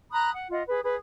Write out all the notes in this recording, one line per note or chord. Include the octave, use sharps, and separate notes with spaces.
A#5 B5 D#6 F#6
F#5
F4 D#5 F#5
G#4 B4
G#4 B4